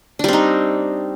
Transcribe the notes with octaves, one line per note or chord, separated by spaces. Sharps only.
G3 C4 D4 D#4